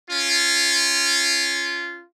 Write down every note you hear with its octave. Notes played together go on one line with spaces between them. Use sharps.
C#4 F4